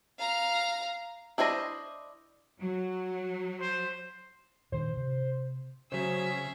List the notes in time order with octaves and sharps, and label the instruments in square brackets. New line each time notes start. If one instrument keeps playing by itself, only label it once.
[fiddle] F5 A#5
[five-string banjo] D4 E4 C5 D5 D#5
[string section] F#3
[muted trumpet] C5
[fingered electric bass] A#2 D#3 D4 [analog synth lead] C5
[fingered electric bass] C3
[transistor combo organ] C#3 [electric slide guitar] F#3 C5 [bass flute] C#4 [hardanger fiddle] G#4 E5